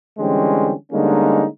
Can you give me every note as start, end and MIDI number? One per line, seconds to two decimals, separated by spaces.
0.18 0.73 50
0.18 0.73 52
0.18 0.73 55
0.18 0.73 56
0.18 0.73 60
0.18 0.73 61
0.92 1.46 50
0.92 1.46 55
0.92 1.46 56
0.92 1.46 58
0.92 1.46 61
0.92 1.46 63